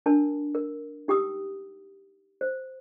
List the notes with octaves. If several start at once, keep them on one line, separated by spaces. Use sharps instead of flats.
D4 A#4 A5
A#4
D#4 G4 G5 D#6 E6
C5